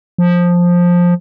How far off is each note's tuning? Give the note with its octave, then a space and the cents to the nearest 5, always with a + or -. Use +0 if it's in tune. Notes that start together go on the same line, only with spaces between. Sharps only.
F3 +10